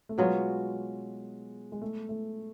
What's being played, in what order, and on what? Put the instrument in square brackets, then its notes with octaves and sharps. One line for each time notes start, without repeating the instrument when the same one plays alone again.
[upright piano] A3
[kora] B2 F#3 B3 F4 [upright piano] G#3
[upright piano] G#3
A3
A3